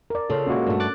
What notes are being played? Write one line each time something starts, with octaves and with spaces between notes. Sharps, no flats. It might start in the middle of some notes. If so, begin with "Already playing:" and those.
A#4 D5
C#3 F4 A4
A#2 G#3 A#3 C#4 F#4
G2 A3
D6 F#6 A6